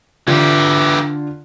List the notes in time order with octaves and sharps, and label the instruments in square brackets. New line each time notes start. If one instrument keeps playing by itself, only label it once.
[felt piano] D3 F4 [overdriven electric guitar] E3 G4